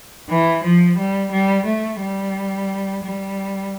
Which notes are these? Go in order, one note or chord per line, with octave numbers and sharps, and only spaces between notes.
E3
F3
G3
G3
A3
G3
G3